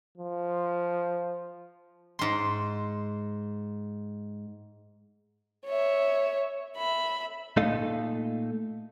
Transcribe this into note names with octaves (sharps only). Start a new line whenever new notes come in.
F3
G#2 C6
C#5 E5
E5 B5
A#2 A3 D#4 A4 D#5 F5